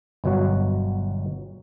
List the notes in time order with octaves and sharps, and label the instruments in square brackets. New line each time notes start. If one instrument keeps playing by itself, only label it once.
[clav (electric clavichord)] G1 B2 F#3 F#4